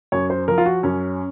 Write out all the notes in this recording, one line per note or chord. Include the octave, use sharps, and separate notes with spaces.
F#2 C#5
C5
F3 A#4
F4
F#4
F#2 C#4